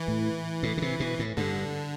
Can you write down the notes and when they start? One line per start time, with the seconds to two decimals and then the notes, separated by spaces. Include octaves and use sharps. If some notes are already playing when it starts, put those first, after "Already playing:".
Already playing: E3
0.08 A2
0.63 A2
0.78 D3
0.82 C3
1.00 B2
1.19 A2
1.37 G2 D3